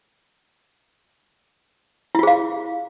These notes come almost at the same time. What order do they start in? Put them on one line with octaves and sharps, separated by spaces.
E4 F4 G#4 F5